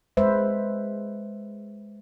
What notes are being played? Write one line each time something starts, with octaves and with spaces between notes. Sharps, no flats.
G#3 B4 C5 E5